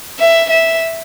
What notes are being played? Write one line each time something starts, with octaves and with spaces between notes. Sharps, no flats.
E5
E5